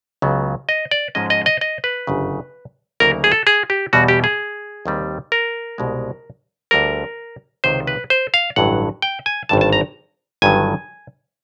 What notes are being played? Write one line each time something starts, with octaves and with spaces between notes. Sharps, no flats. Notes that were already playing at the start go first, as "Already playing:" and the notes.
C#2 C#3 F#3 B3
D#5
D5
G#2 F3 G#3 C#4 D#5
D#5
D#5
D#5
B4
G1 F#2 C#3
D2 C#3 F#3 A#3 D#4 A#4
G#4
A4
G#4
G4
E2 B2 G3 F#4
G4
G#4
D#2 D#3 G3 C4
A#4
C2 B2 G#3
D2 D3 G3 A#4
C#2 C3 D#3 C5
B4
C5
F5
A1 G2 D3 F#3 F#5
G5
G#5
G#1 G2 D3 A5
A5
A#5
G1 G2 D#3 F#3 G#5